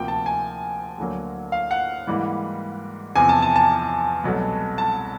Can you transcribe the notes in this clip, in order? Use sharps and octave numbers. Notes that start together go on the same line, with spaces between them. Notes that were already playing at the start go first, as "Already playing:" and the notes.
Already playing: D2 C3 F3 A#3 G5
A5
G#5
D2 D3 F#3 A#3
F5
F#5
G#2 E3 G3 A#3
E2 C3 F3 G#5
A5
A5
A5
C2 B2 F#3 A3
A5